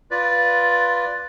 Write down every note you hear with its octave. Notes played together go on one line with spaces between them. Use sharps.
F4 B4 D5